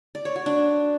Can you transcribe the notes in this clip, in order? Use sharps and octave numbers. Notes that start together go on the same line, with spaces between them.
D5
C#5
F#4
D4